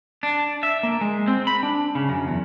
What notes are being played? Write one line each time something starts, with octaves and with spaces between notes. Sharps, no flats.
D4
E5
A#3
G#3
C4
B5
D4
C#3
F#2
E2